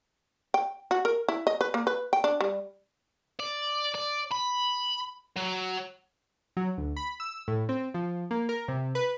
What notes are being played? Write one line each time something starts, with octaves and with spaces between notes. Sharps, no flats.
G5
F#4
A#4
E4
D#5
B4
A#3
B4
G5
D4
G3
D5
D5
B5
F#3
F#3
D2
B5
E6
A2
C4
F3
A#3
A#4
C3
B4